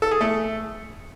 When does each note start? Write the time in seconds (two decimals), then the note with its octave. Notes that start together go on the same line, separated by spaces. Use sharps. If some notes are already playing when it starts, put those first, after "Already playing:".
0.02 A4
0.11 G#4
0.21 A3